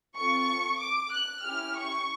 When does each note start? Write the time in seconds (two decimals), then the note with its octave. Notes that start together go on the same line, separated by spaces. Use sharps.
0.16 C4 F4 A4 C#6
0.80 D6
1.13 F#6
1.45 C#4 E4 G4 F6
1.77 C#6